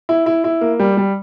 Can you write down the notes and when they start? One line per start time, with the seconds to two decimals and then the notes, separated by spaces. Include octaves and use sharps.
0.09 E4
0.26 E4
0.44 E4
0.61 A#3
0.79 G3
0.97 G3